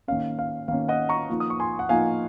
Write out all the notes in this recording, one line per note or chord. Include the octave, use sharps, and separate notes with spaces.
D#3 A#3 C#4 F5
F5
D#3 A#3 C#4 F5
D#5 F#5
A#5 C#6
F3 A#3 D#4
D#6
C#6
G#5 C6
F#5
F3 A#3 D#4 F5 G#5